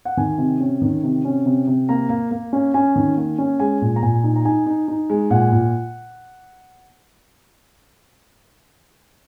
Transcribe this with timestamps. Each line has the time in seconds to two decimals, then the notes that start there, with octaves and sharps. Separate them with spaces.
0.05 F#5
0.17 D#3 G#5
0.38 C3
0.60 C#4
0.82 D#3
1.03 C3
1.25 C#4
1.46 C3
1.67 C3
1.89 A#3 A#5
2.09 A#3
2.31 A#3
2.53 C#4
2.74 C#4 G#5
2.96 D#3
3.17 A#3
3.38 C#4
3.60 G#3 G#5
3.81 A#2
3.96 A#5
4.03 A#2 G#5
4.24 D#4
4.36 A#5
4.45 D#4 G#5
4.66 D#4
4.88 D#4
5.10 G#3
5.30 A#2 F#5
5.52 A#2